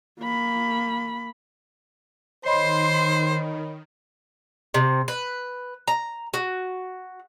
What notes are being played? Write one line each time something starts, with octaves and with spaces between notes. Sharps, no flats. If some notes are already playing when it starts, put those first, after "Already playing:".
A#3 B5
D#3 C5 C#5 D#5 B5 C6
C3
B4
A#5
F#4